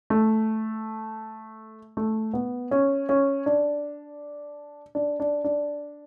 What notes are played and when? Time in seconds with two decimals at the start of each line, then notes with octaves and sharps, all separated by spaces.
0.10 A3
1.97 A3
2.34 B3
2.71 C#4
3.09 C#4
3.46 D4
4.95 D4
5.20 D4
5.44 D4